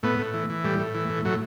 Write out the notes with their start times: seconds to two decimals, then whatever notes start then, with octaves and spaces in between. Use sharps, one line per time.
0.03 A2 B3
0.19 A2
0.34 E3
0.50 E3
0.64 A2 G3
0.80 A2
0.94 E3
1.10 A2
1.25 A2 F#3